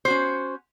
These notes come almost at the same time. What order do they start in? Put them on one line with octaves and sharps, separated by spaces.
C5 F#4 C#4